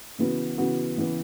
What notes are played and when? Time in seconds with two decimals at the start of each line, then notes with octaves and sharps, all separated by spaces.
0.18 C#3 E3 B3 F#4
0.58 C#3 E3 B3 F#4
0.97 C#3 E3 B3